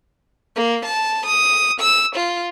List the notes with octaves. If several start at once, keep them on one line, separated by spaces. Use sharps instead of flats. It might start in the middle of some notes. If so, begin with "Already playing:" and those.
A#3
A5
D#6
E6
F4